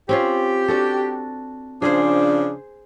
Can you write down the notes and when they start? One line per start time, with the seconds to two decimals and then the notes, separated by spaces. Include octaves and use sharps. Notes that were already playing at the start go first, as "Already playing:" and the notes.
0.09 C4 C#4 F4 G4
0.68 D4 F#4 A4
1.82 C#3 F3 D4 G#4 C5